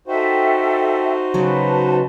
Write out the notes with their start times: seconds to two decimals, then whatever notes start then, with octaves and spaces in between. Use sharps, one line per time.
0.07 D#4 F#4 A4 C5 E5 G5
1.34 C#3 F#3 B4 A5